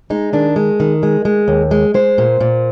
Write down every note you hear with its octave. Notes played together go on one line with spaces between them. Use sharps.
G#3 D#4
D#3 D4
G#3
D#3
G#3
G#3
D#2
G#3
G#3 C5
A#2
A#2